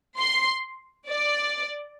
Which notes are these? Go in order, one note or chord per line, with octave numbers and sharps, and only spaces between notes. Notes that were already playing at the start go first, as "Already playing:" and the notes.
C6
D5